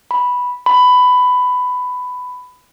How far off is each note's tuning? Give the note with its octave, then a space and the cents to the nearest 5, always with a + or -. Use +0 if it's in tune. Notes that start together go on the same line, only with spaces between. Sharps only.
B5 -5
B5 +15